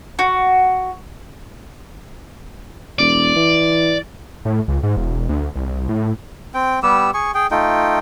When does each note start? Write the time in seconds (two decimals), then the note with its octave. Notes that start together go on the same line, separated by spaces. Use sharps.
0.19 F#4
2.99 E1 D5
3.36 E3
4.45 A2
4.68 C#2
4.83 G#2
4.97 E1
5.29 D2
5.56 C2
5.89 A2
6.54 C4 G5
6.83 G3 B3 G4 E6
7.14 G#4 G#5 C#6
7.34 G#4 G5
7.51 A3 D#4 F4 G5